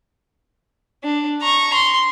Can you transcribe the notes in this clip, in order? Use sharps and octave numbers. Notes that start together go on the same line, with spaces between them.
D4
A#5 C#6
C6